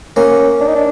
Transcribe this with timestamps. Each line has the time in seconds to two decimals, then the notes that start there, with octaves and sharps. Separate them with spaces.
0.16 A#3 C#4
0.61 D4
0.68 D#4
0.75 D4